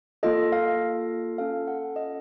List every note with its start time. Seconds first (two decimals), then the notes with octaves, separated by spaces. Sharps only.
0.23 A#3 F4 A4 D#5
0.52 F5
1.38 C#4 F4 A4 F5
1.68 F#5
1.96 D#5